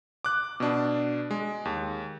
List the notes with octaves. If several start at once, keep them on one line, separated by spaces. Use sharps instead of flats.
D6 F#6
B2 D4
G#3
D#2